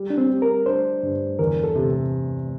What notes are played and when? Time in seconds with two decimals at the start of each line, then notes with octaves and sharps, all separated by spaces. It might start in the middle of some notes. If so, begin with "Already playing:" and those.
Already playing: G3
0.10 D4
0.18 C4
0.30 G3
0.42 A#4
0.66 D4 C5
1.03 G2
1.39 E2 A#4
1.63 A4
1.75 C3